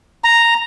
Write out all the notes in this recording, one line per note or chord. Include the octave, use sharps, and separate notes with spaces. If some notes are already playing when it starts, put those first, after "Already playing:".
A#5